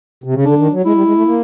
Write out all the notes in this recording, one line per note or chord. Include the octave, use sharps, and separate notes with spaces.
C3
C#3
D3 D4
D#3
F#3
G#3 E4
G3
G#3
A3
A#3